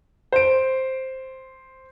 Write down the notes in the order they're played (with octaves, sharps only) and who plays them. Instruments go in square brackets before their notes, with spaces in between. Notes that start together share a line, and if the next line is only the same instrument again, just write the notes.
[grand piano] C5 D7